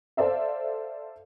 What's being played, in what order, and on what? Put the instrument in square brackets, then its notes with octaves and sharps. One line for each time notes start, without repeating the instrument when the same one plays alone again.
[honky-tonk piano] A4 C5 D5 E5 F5